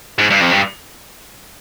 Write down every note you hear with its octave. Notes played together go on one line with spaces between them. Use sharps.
G#2
G2
F2
G2